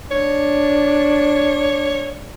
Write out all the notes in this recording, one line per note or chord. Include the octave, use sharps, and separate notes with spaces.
D4 C#5